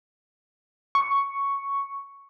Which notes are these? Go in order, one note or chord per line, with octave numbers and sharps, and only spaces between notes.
C#6